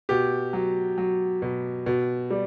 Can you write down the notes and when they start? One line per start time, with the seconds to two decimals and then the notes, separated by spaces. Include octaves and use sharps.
0.09 B2 G4
0.53 F#3
0.98 F#3
1.42 B2
1.86 B2
2.31 G3